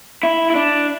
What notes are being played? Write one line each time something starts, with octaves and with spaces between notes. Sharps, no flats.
E4
E4
D4